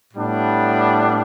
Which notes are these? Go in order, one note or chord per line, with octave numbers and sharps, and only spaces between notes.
A2 G3 B3 D4